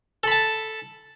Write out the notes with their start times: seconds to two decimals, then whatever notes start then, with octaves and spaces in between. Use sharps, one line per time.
0.23 A4
0.27 B5
0.31 A5